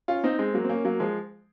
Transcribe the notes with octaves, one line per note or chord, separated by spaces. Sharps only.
C#4 F4
C4 D#4
G#3 C4
F#3 A#3
C4
A#3 C#4
F#3 A#3
F3 G#3